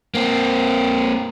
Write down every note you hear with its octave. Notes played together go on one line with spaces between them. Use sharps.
A#3 C4